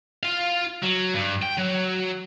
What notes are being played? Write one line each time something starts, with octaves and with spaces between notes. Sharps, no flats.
F4 F5
F#3
G2
G5
F#3